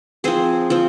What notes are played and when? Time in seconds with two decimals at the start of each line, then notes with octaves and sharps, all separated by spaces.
0.24 F3 C4 G#4 C5
0.70 F3 C4